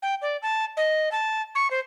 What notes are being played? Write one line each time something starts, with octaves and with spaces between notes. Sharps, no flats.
G5
D5
A5
D#5
A5
C#6
C5